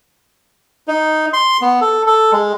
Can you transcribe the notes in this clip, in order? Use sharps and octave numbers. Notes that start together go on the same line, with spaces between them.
D#4
C6
B3
A4
A4
G#3